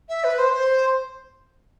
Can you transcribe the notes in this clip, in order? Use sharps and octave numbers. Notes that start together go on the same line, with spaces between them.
E5
B4
C5
C5